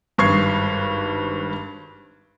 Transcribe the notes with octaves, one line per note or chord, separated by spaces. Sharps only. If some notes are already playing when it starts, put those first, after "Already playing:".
G#1 G2 C#6 G#6 C7